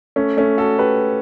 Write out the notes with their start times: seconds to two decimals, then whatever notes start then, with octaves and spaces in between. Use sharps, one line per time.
0.16 A3 C#4
0.37 A3 C#4
0.58 F#4 A4
0.78 G4 B4